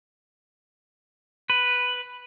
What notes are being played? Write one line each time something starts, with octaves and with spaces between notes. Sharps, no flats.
B4